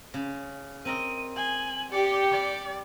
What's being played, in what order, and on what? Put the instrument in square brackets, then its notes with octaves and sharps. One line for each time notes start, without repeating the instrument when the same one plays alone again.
[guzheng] C#3
[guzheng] C4 A#4 D#5 [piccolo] D#7
[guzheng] G#4 [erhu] G#5 [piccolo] F#7
[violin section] G4 [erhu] D5 [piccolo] C#7
[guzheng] G3 [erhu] D5